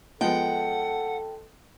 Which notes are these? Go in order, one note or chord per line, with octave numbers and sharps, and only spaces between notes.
F3 G#3 B3 A4 F#5 G5